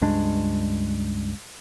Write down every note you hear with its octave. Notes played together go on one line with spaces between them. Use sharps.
C#2 G2 G#3 D4